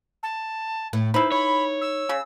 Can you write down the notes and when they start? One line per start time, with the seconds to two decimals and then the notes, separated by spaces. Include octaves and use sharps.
0.23 A5
0.93 A2
1.14 D#4 E4 B4 C5
1.32 C#5 B5
1.81 E6
2.09 C#3